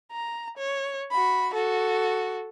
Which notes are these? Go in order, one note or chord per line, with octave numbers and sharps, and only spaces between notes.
A#5
C#5
F#4 B5
F#4 A4